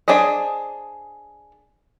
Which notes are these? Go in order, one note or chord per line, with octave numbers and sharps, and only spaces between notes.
D4 G#4 C5 D#5